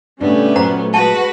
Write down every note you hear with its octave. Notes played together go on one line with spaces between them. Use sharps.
A2 C#3 G3 A3 B3 C#4 D4
A#2 F#3 A#3 C5 F#5 A#5
G#3 F#4 B4 A5